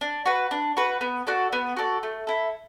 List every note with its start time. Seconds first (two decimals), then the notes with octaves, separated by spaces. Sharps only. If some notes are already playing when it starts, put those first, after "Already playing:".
0.01 D4
0.26 F#4 B4
0.51 D4
0.77 F#4 B4
1.01 B3
1.27 F#4 A4 D5
1.53 B3
1.77 F#4 A4 D5
2.03 A3
2.27 E4 A4